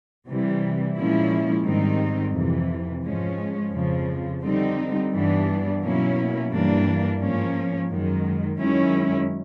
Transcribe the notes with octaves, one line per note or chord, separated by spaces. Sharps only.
C3 E3 G3
A#2 F3 G#3 C#4 E4
G#2 D#3 G3 C4 D#4
F2 C3 E3
G#2 F3 G#3 C#4
F2 C#3 F3
D3 G3 C4 D#4
G2 E3 G3 B3 D4
B2 F#3 A#3 C#4 E4
G2 E3 G3 A#3 D4
G#2 F3 A#3 C#4
F#2 D#3 G#3
F#2 D#3 G#3 C#4 E4